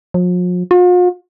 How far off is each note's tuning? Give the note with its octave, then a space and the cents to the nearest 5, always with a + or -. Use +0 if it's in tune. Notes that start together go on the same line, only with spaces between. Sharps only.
F3 +45
F4 +45